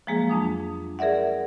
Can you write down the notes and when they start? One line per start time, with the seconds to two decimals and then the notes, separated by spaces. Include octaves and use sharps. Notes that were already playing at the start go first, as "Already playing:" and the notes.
0.07 F3 F#3 G#3 A#3 G#4
0.29 F2 D4 D#6
0.99 G#4 A#4 D5 E5 F#5